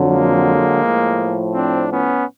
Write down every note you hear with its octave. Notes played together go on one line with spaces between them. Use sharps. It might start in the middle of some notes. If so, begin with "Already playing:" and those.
Already playing: F2 D3 F#3
G#3 A#3
A2 F3
C4 D4
B3 C#4